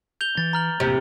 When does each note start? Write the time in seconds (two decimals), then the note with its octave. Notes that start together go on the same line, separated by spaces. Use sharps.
0.21 G6 F7 G7
0.37 E3 A6
0.53 A#5 F6 F#7
0.80 E1 A2 C3 A#3